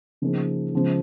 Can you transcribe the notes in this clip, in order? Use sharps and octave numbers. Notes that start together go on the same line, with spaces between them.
C#3 F3 A#3 D#4 G#4
C#3 F3 G#3